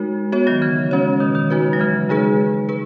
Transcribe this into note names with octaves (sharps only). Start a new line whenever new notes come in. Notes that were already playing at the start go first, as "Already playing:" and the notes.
Already playing: G#3 D#4 F#4 A#4
B3 F#4 C#5
D#3 F#3
C#3 E3
G#3 C#4 F#4 C#5
B2 D#3
B2 D#3
G#3 D#4 F#4 B4
F#3
C#3 E3
G#3 D#4 G#4 B4
G#4 B4